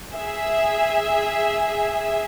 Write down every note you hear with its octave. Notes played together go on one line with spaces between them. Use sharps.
G#4 E5